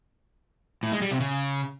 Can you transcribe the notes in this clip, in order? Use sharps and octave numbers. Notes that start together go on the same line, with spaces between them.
A2
G#3
G3
C3
C#3